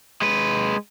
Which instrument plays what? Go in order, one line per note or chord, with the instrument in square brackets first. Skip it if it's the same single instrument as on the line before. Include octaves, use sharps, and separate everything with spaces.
[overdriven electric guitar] G#3 B4